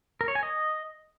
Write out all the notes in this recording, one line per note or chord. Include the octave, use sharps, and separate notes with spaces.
A#4
C#5
G#5
D#5